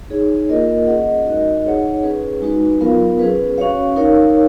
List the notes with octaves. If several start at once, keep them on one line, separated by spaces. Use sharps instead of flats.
D#4 G#4 C#5
A#3 F4 A#4 D#5
C#4 G#4 D#5 F#5
G#3 D#4 F#4 A#4 D#5
D#4 G#4 C#5 F#5
C#4 G#4 B4
G#3 D#4 F#4 B4
F#3 B3 F4 A#4 F5
C#4 G#4 B4
C#4 F#4 C#5 F5
D#4 A#4 C#5 F5